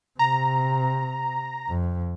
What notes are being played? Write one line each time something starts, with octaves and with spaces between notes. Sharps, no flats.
C3 A#5
F2